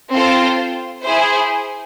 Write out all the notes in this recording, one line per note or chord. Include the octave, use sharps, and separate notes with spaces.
C4 F4 A4 C5
E4 G#4 C5